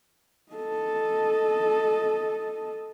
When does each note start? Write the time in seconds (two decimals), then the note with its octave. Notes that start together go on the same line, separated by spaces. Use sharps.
0.52 A4 D#5